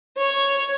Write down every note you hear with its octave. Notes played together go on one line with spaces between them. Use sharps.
C#5